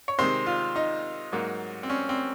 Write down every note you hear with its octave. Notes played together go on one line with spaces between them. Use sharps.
C#5
C3 D#3 G#3 C5
F4
D#4
G#2 F#3 A#3
C4
C#4
C4